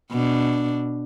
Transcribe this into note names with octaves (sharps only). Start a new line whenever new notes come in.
B2 D4